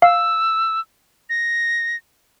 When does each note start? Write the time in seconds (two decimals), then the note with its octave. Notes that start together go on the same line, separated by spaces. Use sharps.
0.02 F5 E6
1.29 A#6